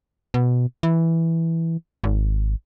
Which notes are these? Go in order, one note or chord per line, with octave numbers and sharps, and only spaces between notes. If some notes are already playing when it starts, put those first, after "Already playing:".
B2
E3
G#1